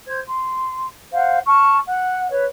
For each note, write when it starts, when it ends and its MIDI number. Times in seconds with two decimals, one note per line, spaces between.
0.07 0.19 72
0.07 0.19 92
0.25 0.86 84
1.12 1.39 72
1.12 1.39 77
1.12 1.39 78
1.45 1.77 81
1.45 1.77 85
1.45 1.77 89
1.86 2.30 78
2.30 2.45 71
2.30 2.45 73